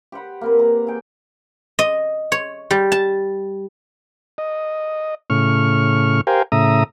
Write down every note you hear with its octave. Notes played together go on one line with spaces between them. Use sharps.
G4 C5 F#5 B5
A#3 C4 B4
A#5
G#4 G5
D#5
C#5
G3
A5
D#5
A2 C#3 C#6 F6
G4 A#4 C5 F5 G5 G#5
A2 C#3 E5 A#5 D#6